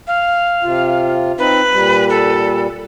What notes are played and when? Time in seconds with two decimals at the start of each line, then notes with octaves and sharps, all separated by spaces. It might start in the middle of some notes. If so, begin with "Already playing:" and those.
0.07 F5
0.63 C3 F4
1.39 C4 D#4 B4
1.72 A#2 G3
2.10 A4